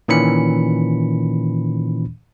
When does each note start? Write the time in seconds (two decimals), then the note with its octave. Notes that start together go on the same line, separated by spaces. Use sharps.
0.08 A#2 D#3 E3 C#4 B5 C#7